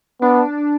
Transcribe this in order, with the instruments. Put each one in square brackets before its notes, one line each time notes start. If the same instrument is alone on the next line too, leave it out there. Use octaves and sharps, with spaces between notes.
[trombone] B3 [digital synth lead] D4